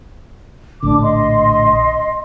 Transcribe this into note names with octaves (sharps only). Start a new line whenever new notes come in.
A#1 A2 D3 D4 D6
D#5 C6